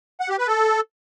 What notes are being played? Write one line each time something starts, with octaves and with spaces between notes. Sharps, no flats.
F#5
G4
B4
A4